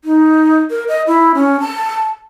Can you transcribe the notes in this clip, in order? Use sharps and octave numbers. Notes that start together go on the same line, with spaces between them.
D#4
A#4
D#5
E4
C#4
A5